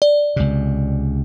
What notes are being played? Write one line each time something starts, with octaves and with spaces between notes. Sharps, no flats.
D5
C#2 C3